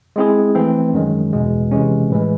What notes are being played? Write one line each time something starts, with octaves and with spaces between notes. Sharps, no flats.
G#3 C4 E4 G#4
E3 A3 C4
F#2 D#3 G#3
E2 B2 G#3
C3 E3 G#3 C#4
A2 E3 G#3